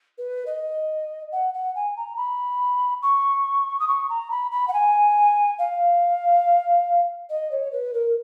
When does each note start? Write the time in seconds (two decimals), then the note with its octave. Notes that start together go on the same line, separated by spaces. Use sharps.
0.18 B4
0.46 D#5
1.32 F#5
1.54 F#5
1.75 G#5
1.96 A#5
2.17 B5
3.02 C#6
3.79 D#6
3.87 C#6
4.09 A#5
4.31 B5
4.51 B5
4.68 F#5
4.73 G#5
5.58 F5
7.29 D#5
7.51 C#5
7.72 B4
7.93 A#4